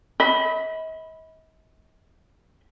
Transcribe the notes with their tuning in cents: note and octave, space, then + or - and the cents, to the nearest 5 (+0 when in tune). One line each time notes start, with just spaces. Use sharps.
D#5 +45 B5 +0